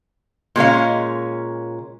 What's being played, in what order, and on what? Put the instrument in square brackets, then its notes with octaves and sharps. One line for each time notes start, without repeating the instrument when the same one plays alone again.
[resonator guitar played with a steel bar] A#2 G#3 C#4 F5